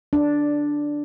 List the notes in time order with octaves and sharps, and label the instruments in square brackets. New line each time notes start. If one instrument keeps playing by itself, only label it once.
[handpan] D4